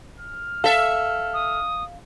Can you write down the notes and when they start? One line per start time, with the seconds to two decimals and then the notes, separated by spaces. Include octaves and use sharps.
0.20 F6
0.64 A4 E5 F5
1.34 D#6